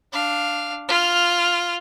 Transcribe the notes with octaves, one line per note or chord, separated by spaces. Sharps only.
D4 F5
F4 F6